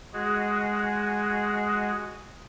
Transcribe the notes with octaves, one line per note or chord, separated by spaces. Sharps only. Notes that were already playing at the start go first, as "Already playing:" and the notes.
G#3 F#4 G#4